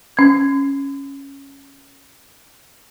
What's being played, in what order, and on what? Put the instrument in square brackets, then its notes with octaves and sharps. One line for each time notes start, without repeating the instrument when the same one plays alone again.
[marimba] C#4 G#6